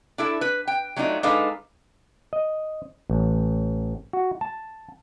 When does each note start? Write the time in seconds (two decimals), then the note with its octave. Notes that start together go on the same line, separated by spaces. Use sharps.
0.18 D4 E4 A4
0.41 B4
0.67 G5
0.96 F#3 A3 D4 D#4 F4
1.23 G#3 D4 D#4 A4 B4 F5
2.33 D#5
3.10 A1
4.13 F#4
4.41 A5